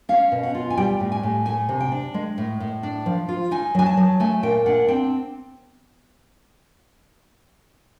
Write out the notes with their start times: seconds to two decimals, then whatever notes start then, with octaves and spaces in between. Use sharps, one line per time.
0.09 C#4 F5
0.32 B2
0.43 F#5
0.55 F4
0.70 G#5
0.77 G3 G5
1.00 A2
1.12 G#5
1.23 A2
1.46 A3 G#5
1.69 C3
1.81 G5
1.92 D4
2.14 G#3
2.38 A2
2.60 A2
2.83 D4
3.06 F3
3.29 F4
3.51 D#4 G#5
3.75 F#3 G#5
3.86 A5
3.97 F#3
4.20 A3 G#5
4.43 A#2 G5
4.66 D4 F#5
4.88 C4 G5